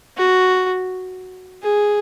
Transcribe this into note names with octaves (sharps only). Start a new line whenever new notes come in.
F#4
G#4